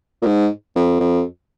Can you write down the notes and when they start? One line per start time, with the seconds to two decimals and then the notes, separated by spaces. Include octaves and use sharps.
0.22 A#2
0.26 G#2
0.76 F2
1.00 F2